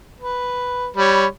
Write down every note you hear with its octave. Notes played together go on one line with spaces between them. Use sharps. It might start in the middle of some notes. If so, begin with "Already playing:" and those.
B4
G3 C#5 B5